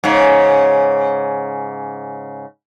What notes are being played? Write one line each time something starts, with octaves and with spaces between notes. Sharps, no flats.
G#2 C#3